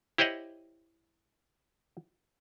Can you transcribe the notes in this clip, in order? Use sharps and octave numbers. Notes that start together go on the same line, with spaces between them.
E4 G4 C5 C#5 D#5 F#5